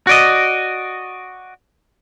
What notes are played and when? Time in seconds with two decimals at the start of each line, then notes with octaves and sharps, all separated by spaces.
0.07 F#4 D5 D#5